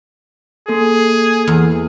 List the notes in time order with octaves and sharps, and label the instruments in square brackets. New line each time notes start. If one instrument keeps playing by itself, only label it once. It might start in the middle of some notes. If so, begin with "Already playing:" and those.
[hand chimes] A#3 A4 [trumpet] G#4
[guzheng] E2